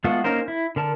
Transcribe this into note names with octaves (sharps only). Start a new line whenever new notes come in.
G#3 A3 B3 F4 F#4
A#3 C#4 D#4 A#4 C5
E4
D3 A#4 A5